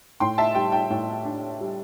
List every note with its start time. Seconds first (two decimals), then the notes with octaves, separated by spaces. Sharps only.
0.20 A2 G5 C6
0.38 E5 A5
0.55 G3 G5
0.72 G5
0.90 A2 G5
1.25 D4
1.61 G3